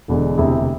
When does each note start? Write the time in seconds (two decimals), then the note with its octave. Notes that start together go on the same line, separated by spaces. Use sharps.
0.08 E1 E2 D3 G#3
0.38 E1 D2 C3 E4 G#4